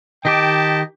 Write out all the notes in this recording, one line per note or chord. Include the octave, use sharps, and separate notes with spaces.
D#3 G4 D#5 G5 A5 D6